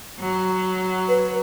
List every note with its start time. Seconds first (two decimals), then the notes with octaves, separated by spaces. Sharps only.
0.20 F#3
1.09 B4